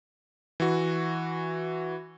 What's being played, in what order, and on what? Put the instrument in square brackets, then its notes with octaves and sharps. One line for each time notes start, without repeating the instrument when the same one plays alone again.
[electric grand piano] E3 F#4